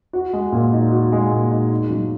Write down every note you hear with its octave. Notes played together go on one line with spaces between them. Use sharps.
F#4
G#3
A#2
D#4
F#4
G#3
A#2
D#4
D#4
F#3